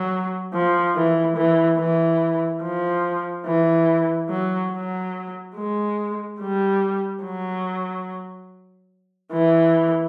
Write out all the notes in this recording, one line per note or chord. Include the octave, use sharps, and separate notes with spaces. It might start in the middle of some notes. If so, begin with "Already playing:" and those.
Already playing: F#3
F3
E3
E3
E3
F3
E3
F#3
F#3
G#3
G3
F#3
E3